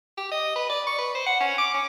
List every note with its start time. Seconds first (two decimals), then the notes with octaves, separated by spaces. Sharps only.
0.18 G4
0.32 D#5
0.56 B4
0.70 D5
0.87 C#6
0.99 B4
1.15 C5
1.26 F#5
1.40 C#4
1.58 D6
1.74 C#4